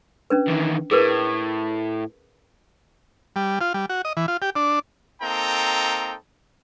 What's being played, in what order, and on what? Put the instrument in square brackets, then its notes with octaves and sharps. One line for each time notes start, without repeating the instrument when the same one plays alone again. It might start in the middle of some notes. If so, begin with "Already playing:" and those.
[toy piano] C#4 D4 B4
[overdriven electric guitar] E2 D#3
[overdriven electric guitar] A2 [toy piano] G#4 A#4 B4
[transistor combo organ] G3
F4
G3
F#4
D#5
E3
F4
G4
D4
[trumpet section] A#3 C4 D#4 A4 G5 A#5